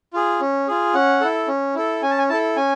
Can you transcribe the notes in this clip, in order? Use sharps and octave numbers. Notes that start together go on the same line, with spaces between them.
F4 G#4
C#4
F4 G#4
C#4 F#5
E4 A4
C#4
E4 A4
C#4 G#5
A5
G#5
E4 A4 A5
C#4 G#5